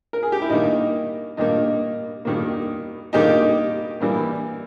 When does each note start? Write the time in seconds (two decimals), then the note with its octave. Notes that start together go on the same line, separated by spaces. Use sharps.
0.13 A#4
0.23 G#4
0.32 G4
0.42 E4
0.50 G2 D#3 A#3 D#4
1.37 G2 D#3 A#3 D#4
2.25 G2 D#3 A#3
3.13 G2 D#3 A#3 D#4 G4
4.01 G2 E3 G3 A#3